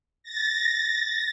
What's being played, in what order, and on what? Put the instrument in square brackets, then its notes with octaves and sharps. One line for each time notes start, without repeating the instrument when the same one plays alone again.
[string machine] A6 A#6